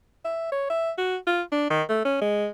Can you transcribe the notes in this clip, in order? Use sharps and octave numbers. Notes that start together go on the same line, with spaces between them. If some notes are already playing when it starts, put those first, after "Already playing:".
E5
C#5
E5
F#4
F4
D4
D#3
A3
C#4
G#3